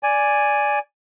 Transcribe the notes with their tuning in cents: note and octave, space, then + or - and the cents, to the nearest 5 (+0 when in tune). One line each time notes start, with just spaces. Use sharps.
D5 -5 G#5 +0